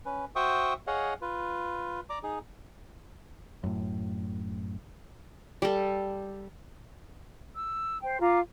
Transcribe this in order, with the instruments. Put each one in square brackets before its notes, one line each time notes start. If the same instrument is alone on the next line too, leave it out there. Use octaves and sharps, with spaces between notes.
[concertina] C#4 B4
F#4 C5 E5 G5 C#6 D#6
G#4 C#5 D#5 F5 F#5
F4 B4
D5 A#5 D6
D#4 G#4
[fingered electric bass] F#2 A2
[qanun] G3 A4
[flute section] E6
C5 G5
F4 A#5 D6